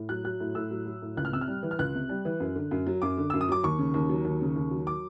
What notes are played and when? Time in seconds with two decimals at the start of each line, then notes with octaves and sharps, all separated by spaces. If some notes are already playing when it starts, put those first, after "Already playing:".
Already playing: A2
0.09 F#3 F#6
0.24 F#3 F#6
0.40 A2
0.55 A2 E6
0.71 F#3
0.86 F#3
1.02 A2
1.17 C#2 F#6
1.25 F6
1.33 C3 E6
1.41 F6
1.48 G3
1.63 E3
1.71 F6
1.79 C#2 F#6
1.95 C3
2.09 G3
2.25 E3
2.40 F#2
2.56 D3
2.71 F#2
2.87 F#3
3.02 F#2 D6
3.17 D3
3.30 F#2 E6
3.41 D#6
3.49 F#3 D6
3.63 D#2 C#6
3.79 C#3
3.94 D#2
4.09 F#3
4.25 D#2
4.42 C#3
4.56 D#2
4.71 F#3
4.87 D6